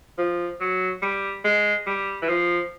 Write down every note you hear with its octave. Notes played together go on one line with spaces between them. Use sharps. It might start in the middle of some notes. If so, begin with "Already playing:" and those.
F3
F#3
G3
G#3
G3
E3
F3